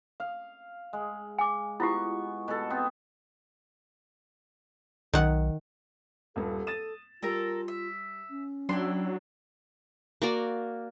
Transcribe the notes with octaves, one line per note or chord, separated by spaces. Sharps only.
F5
G#3
G#5 D6
B3 E4 F4 G4 C#6
B2 A4
B3 C4
B1 D#3 F#5
D#1 G2 A4
D#6 A6 E7
G3 F4 A4 A#4 A#5
E5
C#4
F#3 D4 E4 G5 C6
A#3 F#4 D5